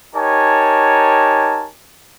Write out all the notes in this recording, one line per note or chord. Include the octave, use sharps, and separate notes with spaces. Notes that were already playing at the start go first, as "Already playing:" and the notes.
D#4 G4 A#4 C#5 G#5 A5